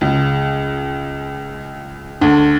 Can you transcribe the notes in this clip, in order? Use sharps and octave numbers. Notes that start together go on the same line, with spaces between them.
C#2 C#3
D2 D3